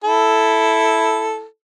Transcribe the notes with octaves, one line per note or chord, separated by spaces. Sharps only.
E4 A4